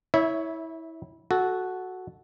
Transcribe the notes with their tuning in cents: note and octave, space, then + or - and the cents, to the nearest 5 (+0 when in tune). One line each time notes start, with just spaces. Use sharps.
E4 -25 C#5 +10 E5 +0
F#4 +0 A4 -15